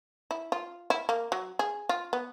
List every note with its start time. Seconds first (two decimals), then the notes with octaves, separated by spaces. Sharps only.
0.31 E4
0.52 F4
0.90 E4
1.09 A#3
1.32 F#3
1.59 G#4
1.89 F4
2.13 B3